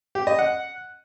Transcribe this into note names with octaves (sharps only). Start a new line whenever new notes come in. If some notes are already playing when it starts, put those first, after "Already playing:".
G4
D#5
F#5